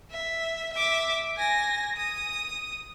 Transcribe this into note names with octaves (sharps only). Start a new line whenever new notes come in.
E5
E5 D6
G#5 A#6
D#6